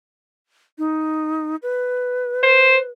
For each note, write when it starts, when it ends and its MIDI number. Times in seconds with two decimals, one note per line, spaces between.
0.78 1.56 63
1.63 2.90 71
2.43 2.78 72